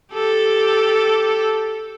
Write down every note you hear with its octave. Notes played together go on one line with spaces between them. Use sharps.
G4 A4